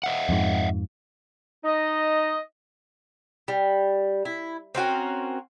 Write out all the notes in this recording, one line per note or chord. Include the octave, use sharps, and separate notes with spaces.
D#5 E5 F#5
F2 G#2
D#4 D#5
G3
E4
C4 C#4 F#4 A#4